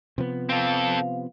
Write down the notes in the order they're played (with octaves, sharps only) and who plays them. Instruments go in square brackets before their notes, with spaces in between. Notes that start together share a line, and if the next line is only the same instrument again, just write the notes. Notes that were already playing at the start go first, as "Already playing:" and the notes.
[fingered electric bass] C3 F3 B3
[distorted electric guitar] C4 A4 [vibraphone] F5